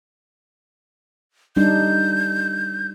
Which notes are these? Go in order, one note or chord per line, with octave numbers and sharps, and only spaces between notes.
G3 D4 D#4 G6